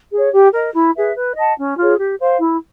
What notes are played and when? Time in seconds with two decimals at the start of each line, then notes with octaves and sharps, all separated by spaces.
0.12 G#4 C#5
0.32 G4
0.53 A#4 D#5
0.74 E4
0.95 G#4 B4 E5
1.15 B4
1.36 D#5 F#5 A5
1.57 C#4
1.77 F4 G#4 C#5
1.98 G4
2.19 C5 F5
2.39 E4